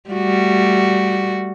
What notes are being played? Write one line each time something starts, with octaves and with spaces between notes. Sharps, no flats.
G3 A3 F#4